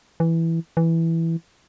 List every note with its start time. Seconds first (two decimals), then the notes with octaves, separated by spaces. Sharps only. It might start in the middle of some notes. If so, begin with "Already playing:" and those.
0.20 E3
0.77 E3